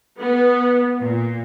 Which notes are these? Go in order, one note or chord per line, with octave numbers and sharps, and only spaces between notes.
B3
A#2